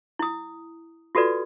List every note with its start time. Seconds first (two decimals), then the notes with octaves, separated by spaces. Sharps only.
0.19 E4 D#6
1.15 F4 F#4 A4 B4 D5